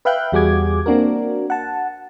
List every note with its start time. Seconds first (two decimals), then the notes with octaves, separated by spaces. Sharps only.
0.05 B4 E5 F5 G5 F#6 G6
0.32 E2 G3 F#4 G#4 D6 G#6
0.86 A#3 C4 D4 F#4 A#4
1.50 F#5 A5